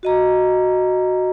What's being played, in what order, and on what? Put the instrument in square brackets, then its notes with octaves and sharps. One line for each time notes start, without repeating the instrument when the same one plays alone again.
[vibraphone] F#4 D#5 A#5